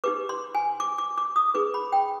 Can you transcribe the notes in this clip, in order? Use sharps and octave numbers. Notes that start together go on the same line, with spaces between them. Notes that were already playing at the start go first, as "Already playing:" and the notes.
D#4 G4 B4 D6
C6
G#5
D6
D6
D6
D#6
D#4 G#4 B4 D6
B5
G5